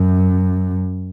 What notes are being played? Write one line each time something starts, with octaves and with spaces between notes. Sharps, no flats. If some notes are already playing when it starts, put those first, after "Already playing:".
Already playing: F#2